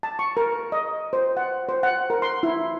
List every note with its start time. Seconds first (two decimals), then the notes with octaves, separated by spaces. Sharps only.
0.03 A5
0.19 C#6
0.37 A#4
0.72 D#5
1.13 C5
1.37 F#5
1.69 C5
1.83 F#5
2.10 A#4
2.22 C6
2.43 E4